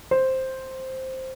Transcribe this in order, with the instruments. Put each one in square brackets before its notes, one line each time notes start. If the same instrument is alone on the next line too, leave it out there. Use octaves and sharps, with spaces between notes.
[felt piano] C5